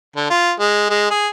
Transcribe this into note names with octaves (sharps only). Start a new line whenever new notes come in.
D3
F4
G#3
G#3
G#4